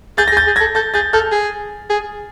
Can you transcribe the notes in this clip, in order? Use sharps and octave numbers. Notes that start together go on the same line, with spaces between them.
G#4 G6 A6
A#6
G#4
G6 A6
G#4
A4 G#6 A#6
A4 G6 A6
G#4 G6 A6
A4 F6 G6
G#4
G#4